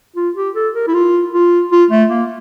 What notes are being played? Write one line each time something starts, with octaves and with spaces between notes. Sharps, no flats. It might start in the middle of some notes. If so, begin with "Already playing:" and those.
F4
G4
A4
A#4
E4
F4
F4
F4
A3
A#3